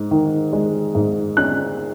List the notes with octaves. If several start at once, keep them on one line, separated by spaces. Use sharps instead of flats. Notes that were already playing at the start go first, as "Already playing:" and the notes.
Already playing: G#2
D#3
G#3
G#2
C#4 F#6